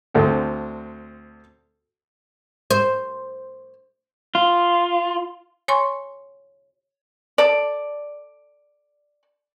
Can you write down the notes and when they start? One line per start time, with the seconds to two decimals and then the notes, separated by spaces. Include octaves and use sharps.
0.14 D2 D3 C4
2.71 C5
4.35 F4
5.68 C#5 G#5 C6 C#6
7.38 A4 D5